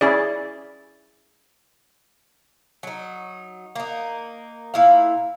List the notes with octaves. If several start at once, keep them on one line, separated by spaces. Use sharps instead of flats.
C#4 E4 G#4 D5
F#3 D#4
A#3 D#4
A#2 E4 F5